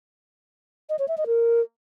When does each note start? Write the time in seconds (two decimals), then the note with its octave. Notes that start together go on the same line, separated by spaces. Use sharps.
0.89 D#5
0.99 C#5
1.08 E5
1.18 D#5
1.27 A#4